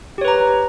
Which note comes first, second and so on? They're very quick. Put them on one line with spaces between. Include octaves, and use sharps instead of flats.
G4 C#5 B4 A#5